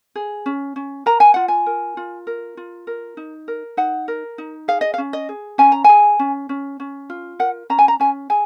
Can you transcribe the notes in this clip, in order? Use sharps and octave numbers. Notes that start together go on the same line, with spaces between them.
G#4
C#4
C#4
A#4 A#5
G#5
F4 F#5
G#5
A#4
F4
A#4
F4
A#4
D#4
A#4
D#4 F#5
A#4
D#4
G#4 F5
D#5
F5
C#4
D#5
G#4
C#4 G#5
A#5
G#4 G#5
C#4
C#4
C#4
F4
A#4 F#5
C#4 A#5
G#5
A#5
C#4 G#5
G#4 G#5